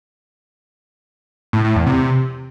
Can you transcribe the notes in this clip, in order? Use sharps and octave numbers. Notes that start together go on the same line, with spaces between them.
A2
A2
E2
C3